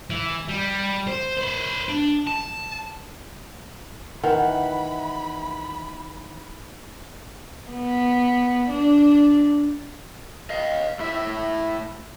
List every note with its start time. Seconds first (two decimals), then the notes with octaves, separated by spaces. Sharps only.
0.10 E3
0.48 G3
1.07 C5
1.38 B4 C5
1.89 D4
2.27 A5
4.23 D#3 E3 F#5 B5
7.71 B3
8.70 D4
10.50 D#5 F5
11.00 A2 E4 E5